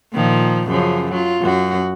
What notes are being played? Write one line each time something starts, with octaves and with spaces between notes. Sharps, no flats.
A#2 D#3 F3
F#2 C#3 F3
F#3 F4
F#2 F#4